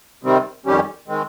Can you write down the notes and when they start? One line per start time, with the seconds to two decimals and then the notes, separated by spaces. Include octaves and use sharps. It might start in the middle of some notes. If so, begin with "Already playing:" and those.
0.23 C3 D#3 G3 C4
0.65 F2 D#3 G3 C#4 G4
1.08 D#3 G#3 C4